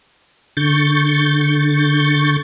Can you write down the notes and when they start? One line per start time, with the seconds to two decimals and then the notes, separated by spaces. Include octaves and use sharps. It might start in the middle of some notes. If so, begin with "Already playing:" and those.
0.57 D3 C#6 G6 A6